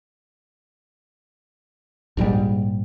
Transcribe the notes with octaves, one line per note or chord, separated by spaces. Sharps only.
A#1 G#2 D#3 G3